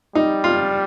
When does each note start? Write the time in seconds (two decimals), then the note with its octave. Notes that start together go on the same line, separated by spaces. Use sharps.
0.15 G3 D#4
0.44 F4